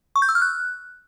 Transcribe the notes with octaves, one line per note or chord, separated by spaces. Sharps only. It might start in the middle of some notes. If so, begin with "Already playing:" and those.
C#6
G6
E6
F6
F#6